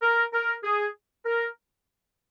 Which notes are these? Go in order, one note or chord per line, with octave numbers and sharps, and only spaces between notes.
A#4
A#4
G#4
A#4